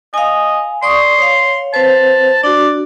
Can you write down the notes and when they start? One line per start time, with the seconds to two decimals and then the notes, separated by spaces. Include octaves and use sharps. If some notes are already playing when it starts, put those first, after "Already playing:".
0.14 D#5 F5 G#5
0.83 D5 C6 C#6 D#6
1.18 C#5 F5
1.74 C4 B4 C5 A5
2.44 D4 F#4 D5